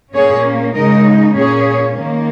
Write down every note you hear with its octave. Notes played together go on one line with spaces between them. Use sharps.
A#2 A#3 C#4 G#4 C#5
C#3 G#3 D#4 A#4 D#5
A#2 A#3 C#4 G#4 C#5
D#3 A#3